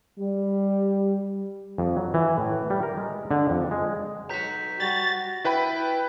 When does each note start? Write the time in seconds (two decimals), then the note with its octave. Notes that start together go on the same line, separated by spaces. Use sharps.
0.19 G3
1.78 F2
1.96 F#3
2.14 E3
2.38 A2
2.70 G3
2.83 A#4
2.97 G#3
3.31 D3
3.50 F2
3.71 G#3
4.30 B1 F#4 A#5 G6 B6
4.80 G3 F#4 A6
5.45 E4 B4 G5 B5